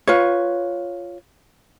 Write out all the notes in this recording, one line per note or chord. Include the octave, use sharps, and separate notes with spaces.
F4 B4 C#5